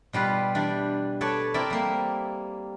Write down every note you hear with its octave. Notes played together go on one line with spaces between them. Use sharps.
B2 G3 F4 B4
E3 D4 G4 D5
A4 B4 C#5 D5 A5
C4 E4 A4 A#4 D5 E5
G3 A#3